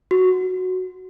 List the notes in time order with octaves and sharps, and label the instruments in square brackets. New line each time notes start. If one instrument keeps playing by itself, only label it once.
[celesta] F#4